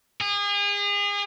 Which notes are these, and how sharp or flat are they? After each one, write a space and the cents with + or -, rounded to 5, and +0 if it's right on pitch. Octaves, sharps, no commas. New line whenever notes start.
G#4 -35